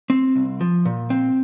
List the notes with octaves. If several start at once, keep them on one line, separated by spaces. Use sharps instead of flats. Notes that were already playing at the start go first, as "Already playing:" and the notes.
C4
C2
F3
A#2
C4